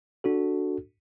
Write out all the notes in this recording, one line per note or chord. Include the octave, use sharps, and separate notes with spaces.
D4 F#4 A4